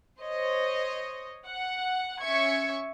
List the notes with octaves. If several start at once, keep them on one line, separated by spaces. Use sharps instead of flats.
C5 C#5 D#5
F#5
C#4 E5 C#6 G#6 C#7